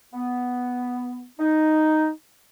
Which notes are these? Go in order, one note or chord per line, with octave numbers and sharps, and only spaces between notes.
B3
D#4